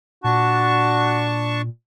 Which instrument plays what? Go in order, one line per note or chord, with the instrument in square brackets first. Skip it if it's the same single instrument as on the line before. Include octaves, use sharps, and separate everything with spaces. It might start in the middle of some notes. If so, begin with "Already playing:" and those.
[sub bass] A#2 [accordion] D4 A5 C#6 [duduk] F#4